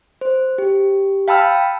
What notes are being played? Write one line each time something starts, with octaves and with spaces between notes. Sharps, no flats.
C5
G4
F5 G5 A5 B5 E6 F6